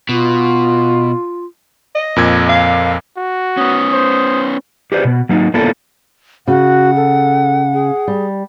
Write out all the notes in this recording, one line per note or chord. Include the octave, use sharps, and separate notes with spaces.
B2 F4
D#5
F2 A#2 G#6
F5
F#4
B3 C#4 D#6
C5
G4 G#4 B4 C5 D5
B2 B3
F#3 A#3 D#4
A#3 B3 D4 E4 F4 A4
C#3 F#4 F#5
A4
G#4
G3